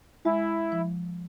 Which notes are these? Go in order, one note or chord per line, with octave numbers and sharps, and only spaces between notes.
G#3 E4
F3